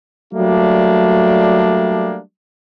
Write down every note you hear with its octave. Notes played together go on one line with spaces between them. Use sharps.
F#3 G3 A3 A#3 D4